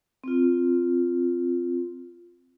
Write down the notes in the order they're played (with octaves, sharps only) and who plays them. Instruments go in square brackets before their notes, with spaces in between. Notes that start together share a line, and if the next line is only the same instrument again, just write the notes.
[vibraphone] C4 F4